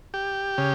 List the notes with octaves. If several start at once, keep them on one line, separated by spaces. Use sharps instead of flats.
G4
C#3